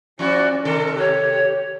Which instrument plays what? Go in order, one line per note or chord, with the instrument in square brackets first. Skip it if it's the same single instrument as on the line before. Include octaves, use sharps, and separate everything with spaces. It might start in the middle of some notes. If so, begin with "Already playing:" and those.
[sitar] F3 E4 F#4 [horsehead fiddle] C#4 D5
[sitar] C3 D#3 A4 [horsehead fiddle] A#4
[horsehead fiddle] G4 [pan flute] C#5